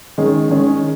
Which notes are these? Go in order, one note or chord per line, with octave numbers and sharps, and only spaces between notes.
D#3 G#3 C#4 G#4
D#3 G#3 C#4 G#4